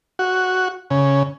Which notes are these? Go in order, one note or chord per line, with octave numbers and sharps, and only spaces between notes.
F#4
C#3